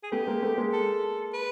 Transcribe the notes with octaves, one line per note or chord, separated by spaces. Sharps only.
G#4
A3 B3 G4
G#3 A#3
A3 B3
G#3 A#3
A4
B4